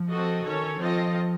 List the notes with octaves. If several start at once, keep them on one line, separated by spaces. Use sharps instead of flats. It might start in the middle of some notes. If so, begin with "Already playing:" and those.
Already playing: F3
C4 F#4 A4 D#5
D#3 C#4 A4 C#5
F3 C4 F4 A4 D#5